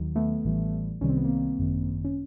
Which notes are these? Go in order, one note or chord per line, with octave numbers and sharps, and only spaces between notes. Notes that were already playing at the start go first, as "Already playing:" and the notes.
Already playing: D#2 D#3 F#3
A3 B3
A1 A2 E3 G3
C2 C3 D#3 G3 C#4
C4
B3
A#3 C4
G#1 F#2 D#3
C#4